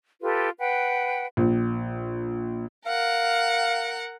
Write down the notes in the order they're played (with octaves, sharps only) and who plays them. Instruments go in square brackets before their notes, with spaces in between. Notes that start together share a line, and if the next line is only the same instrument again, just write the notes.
[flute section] F4 G4 A4 B4
B4 F#5 G5
[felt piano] A#1
[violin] A#4 F#5 [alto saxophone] F5